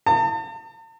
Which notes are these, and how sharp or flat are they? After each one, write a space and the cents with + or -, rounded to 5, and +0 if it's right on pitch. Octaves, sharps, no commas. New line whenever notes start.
A5 +45